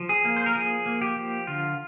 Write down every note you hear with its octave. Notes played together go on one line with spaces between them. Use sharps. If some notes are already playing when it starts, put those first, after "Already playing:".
Already playing: F3
G#4
A#3
C5
A#4
F3 G#4
A#3
G4
F3
D3 F4